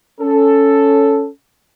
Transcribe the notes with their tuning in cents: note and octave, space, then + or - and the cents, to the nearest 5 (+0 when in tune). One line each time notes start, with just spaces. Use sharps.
C#4 +5 A4 +0